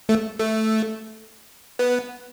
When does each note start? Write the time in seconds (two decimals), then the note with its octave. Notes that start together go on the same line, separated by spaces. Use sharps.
0.09 A3
0.39 A3
1.79 B3